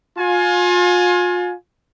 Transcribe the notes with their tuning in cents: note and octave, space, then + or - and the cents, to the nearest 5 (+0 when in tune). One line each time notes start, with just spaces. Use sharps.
F4 +35 G#5 +15